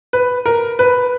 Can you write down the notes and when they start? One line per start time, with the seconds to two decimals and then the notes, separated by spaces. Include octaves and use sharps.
0.13 B4
0.46 A#4
0.79 B4